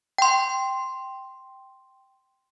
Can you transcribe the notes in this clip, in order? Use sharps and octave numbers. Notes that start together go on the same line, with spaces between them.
G5 C6